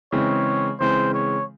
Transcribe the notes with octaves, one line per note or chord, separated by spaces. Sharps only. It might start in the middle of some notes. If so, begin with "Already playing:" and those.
C#3 E3 G#3 C4 C#5
C#3 E3 G#3 C4 C5
C#5